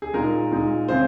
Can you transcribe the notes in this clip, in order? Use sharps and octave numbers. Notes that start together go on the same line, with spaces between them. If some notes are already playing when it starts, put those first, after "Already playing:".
G#4
A#2 G#3 D#4 A#4
A#2 G#3 D#4
C#3 G#3 C4 C5